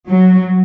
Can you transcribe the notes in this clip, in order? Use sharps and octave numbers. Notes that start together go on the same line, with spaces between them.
F#3